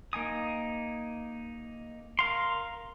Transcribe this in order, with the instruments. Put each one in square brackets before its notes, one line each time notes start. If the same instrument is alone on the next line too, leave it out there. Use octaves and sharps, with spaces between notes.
[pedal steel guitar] A#3 D#4 G#5 D#6
A#4 F5 C6